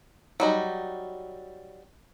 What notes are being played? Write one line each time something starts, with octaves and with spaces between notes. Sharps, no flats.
F#3 G3 D#4